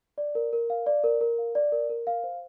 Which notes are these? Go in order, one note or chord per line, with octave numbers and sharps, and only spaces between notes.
D5
A#4
A#4
F5
D5
A#4
A#4
F5
D5
A#4
A#4
F5
C5